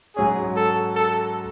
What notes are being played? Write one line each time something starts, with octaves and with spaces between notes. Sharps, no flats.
G#2 F#3 C#4 G#4
A4
A4